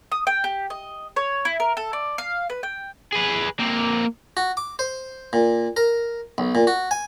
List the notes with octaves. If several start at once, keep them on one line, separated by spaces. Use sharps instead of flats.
D#6
G5
G4
D#5
C#5
E4
A#4
A4
D5
F5
B4
G5
G#4 B4
A#3 C4
F#4
D6
C5
A#2
A#4
B1
A#2
F#4
G#5